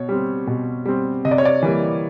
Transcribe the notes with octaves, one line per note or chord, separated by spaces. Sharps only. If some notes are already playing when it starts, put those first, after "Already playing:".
Already playing: B2 C#5
G3 C4
B2
G3 C4
C3 D#5
D5
C#5
D5
E3 G3 A#3